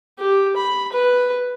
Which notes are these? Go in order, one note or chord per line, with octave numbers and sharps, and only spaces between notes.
G4
B5
B4